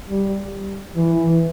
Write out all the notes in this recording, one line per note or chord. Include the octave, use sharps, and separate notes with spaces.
G3
E3